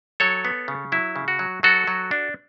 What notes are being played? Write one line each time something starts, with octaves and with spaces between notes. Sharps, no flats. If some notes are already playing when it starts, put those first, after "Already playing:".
F#3 A4 C#5
B3
C#3
F#3 E4
C#3
F#4
F#3
F#3 F#4 A4
F#3
D4